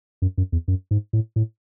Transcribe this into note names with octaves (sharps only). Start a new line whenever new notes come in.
F#2
F#2
E2
F#2
G#2
A2
A2